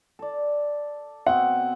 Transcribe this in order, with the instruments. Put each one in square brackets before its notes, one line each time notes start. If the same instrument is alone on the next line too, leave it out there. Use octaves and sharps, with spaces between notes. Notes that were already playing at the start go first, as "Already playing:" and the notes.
[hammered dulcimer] A4 D5
[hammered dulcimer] B2 C4 [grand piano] F#5